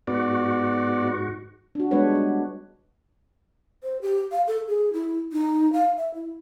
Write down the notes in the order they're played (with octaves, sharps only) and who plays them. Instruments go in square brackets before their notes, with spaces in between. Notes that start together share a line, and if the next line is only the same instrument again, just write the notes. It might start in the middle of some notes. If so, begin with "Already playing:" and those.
[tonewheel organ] G#2 F#4 [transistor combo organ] B3 D5
[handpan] D4 F#4
G3 G#3 B3 D4 B4 C#5
D4 F#4
[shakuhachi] C5
G4
F5
A4
G#4
E4
D#4
F5
E5
E4